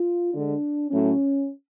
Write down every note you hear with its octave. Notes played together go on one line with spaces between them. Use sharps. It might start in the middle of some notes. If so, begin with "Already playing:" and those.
Already playing: F4
D3 G#3 D4
A2 F#3 A3 C#4